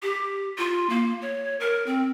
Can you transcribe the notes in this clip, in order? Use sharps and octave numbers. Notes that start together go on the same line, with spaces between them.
G4
F4
A#3
C#5
A#4
C4